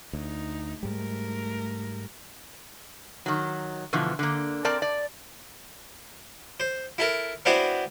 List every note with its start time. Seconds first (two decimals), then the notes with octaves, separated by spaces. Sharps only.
0.13 D2 D#4
0.83 G#2 G3 A3 A#4
3.26 D#3 F#3
3.93 B2 D3 E3 F3
4.19 D3 A#3
4.64 C4 A#4 D5 A5
4.82 D5
6.60 C5
6.98 E4 A4 A#4
7.45 B3 C4 D4 E4 F#4 C5